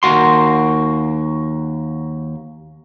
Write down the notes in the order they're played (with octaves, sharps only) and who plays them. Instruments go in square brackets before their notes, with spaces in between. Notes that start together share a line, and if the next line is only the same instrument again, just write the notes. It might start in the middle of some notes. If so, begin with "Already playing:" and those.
[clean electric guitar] D#2 A#3 F#4 C6